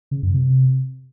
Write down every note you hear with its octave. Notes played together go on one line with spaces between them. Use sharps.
C#3
F#2
C3